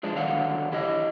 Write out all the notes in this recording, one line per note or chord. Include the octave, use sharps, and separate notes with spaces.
F3 G#3 D4
D3 D#3 F#3 F5 F#5
E4 G4 D#5